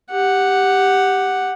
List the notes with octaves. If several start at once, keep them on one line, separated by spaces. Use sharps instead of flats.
G4 F#5